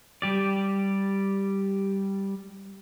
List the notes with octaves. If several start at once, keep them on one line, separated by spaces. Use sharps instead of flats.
G3 G4 D5